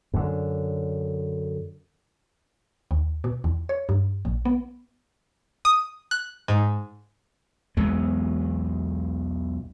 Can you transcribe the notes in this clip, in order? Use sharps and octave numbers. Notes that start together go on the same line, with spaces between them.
F#2 D3
D#2
B2
E2
C#5
G2
A#1
B3
D#6
F#6
G#2
B1 E2 G#3 B3